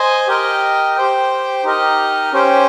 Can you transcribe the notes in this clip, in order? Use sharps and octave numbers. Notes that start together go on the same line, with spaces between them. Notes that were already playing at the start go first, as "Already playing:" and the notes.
Already playing: C5 D#5 G#5
G4 A#4 D#5 G5
G4 C5 G5
D#4 G4 A#4 D#5
C#4 G4 C5 G5